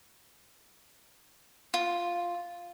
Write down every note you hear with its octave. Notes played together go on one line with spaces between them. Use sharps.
F4